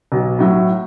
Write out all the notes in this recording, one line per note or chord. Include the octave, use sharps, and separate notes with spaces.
B1
A2 F#3